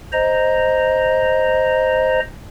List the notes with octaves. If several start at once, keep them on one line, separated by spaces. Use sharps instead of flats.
C5 D#5 A#5